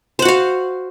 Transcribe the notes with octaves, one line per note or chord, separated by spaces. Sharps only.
F#4 C5 F5 F#5